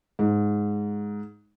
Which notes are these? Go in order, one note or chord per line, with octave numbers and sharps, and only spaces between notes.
G#2